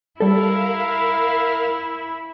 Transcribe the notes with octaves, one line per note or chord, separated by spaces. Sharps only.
G3 E4 A4 A#4 F5